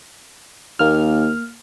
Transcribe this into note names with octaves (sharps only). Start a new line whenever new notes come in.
D#2 A#3 F6